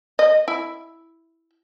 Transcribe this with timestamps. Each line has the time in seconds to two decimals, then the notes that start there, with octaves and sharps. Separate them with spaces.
0.19 D#5
0.48 E4